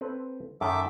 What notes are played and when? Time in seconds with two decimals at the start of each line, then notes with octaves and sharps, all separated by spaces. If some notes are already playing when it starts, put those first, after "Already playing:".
0.01 C4 A4 B4
0.61 F#2 D#3 A4 E5 D6